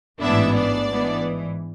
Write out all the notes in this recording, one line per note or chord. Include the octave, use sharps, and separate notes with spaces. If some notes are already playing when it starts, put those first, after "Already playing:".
A1 G#2 E3 B3 D4 E4 E5
D4 D5
G#2 E3 B3